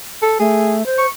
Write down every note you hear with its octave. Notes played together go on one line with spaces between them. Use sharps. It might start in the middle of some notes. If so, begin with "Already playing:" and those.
A4
A3 G#4
C5
C#6